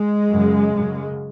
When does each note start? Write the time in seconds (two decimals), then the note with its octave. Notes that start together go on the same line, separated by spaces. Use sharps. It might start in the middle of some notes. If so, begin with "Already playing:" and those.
Already playing: G#3
0.30 F#2 C#3
0.73 F#2 C#3